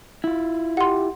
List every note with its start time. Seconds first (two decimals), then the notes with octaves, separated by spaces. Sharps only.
0.24 E4 F4
0.77 G4 F#5 C6